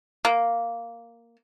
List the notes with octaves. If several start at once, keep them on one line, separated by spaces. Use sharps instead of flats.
A#3